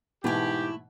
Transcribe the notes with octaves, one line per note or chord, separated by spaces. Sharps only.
G#2 B2 E3 A3 E4 G4